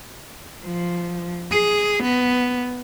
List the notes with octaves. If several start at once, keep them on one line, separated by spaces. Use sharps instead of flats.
F3
G#4
B3